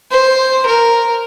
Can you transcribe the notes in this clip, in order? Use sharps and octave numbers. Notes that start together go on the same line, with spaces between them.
C5
A#4